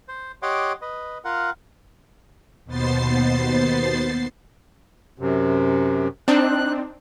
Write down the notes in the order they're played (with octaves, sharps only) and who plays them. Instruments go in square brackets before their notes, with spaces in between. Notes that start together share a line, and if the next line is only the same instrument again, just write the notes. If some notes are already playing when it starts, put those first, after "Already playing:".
[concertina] C5
G4 C#5 D#5 F#5 C6 D6
B4 D#5
F4 A#4 F#5
[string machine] D#2 B2 B3 C5 A6 C7
[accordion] F#2 C3
[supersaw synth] C4 D4 D#4 [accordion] F#6